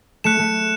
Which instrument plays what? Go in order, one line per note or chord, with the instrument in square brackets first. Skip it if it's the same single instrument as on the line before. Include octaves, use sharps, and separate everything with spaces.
[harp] A3 [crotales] F#6 C#7 E7
[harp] A3